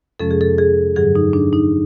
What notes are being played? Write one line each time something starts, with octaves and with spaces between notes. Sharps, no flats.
F2 C3 F3 G#3 C#4 A4
G#4
A4
G#4
G2 D3 F#3 G#4
D#4
D4
D#4